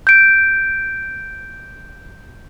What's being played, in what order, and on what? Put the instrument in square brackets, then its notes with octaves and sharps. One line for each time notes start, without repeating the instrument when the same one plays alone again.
[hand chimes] G6 D7